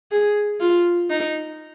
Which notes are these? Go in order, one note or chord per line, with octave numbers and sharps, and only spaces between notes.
G#4
F4
D#4